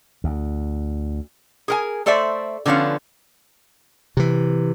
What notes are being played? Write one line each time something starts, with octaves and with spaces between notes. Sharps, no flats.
D2
G#4 A#4 G#5
A3 A4 C5 D5 E5
D3 F3 B3 C#4 F5
C3 E3